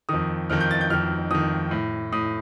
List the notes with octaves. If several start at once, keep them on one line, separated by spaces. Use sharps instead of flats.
F2 D#3 D#6
F2 D#3 F6
G6
A6
G6
F2 D#3 F6
F2 D#3 D#6
A2
A2 D#6